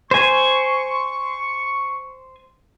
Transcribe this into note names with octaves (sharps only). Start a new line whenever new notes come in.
C5 G#5 C#6